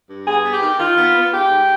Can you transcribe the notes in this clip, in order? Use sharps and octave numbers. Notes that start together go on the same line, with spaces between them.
G2
B3 G#4
B3
G4
D#3
D#3 F4
B3
B3
G#2 G4
G#2